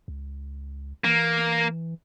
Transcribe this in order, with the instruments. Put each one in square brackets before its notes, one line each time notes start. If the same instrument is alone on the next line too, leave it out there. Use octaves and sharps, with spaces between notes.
[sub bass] C#2
[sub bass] E3 [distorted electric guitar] A#3